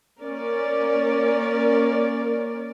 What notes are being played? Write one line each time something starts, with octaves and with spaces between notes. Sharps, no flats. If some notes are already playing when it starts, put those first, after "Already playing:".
A#3 C#4 A#4 D5